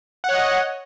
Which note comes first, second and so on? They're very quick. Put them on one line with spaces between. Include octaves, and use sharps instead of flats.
F#5 C#5 D#5